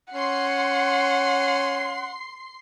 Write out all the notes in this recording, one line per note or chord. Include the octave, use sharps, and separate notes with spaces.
C#4 F#5 C6 C7